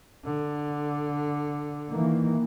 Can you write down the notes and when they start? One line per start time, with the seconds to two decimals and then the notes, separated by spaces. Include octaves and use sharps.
0.24 D3
1.91 D#3 E3 A#3